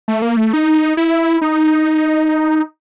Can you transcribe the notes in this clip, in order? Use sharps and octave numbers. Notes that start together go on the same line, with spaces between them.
A3
A#3
A3
D#4
E4
D#4